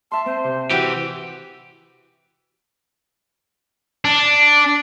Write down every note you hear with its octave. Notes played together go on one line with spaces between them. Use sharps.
E5 A5 C6
C4 C5
C3
E3 F#4 G4 G5
D4